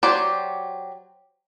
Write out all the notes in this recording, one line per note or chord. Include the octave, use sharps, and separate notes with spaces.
F#3 F#4 G4 C5 D5